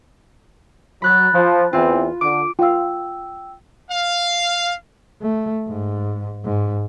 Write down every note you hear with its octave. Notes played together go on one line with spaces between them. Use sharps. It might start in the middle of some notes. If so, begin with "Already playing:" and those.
F#3 B5 F#6 A6
F3
E2 E3 C4 F4
D3 D6
F4 F5 G5 E6
F5
A3
G#2
G#2